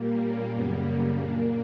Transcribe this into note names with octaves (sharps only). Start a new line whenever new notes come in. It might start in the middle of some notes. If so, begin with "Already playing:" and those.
Already playing: A#2 G3 A#3
C#4
F#2 C#3 G3 A#3 B3
C#4
A#2 A#3 D4